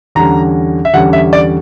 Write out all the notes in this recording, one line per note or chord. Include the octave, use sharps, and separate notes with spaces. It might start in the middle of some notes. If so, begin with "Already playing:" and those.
E2 D3 G3 C#4 A#5
E5
E2 D3 G3 C#4 F#5
E5
D5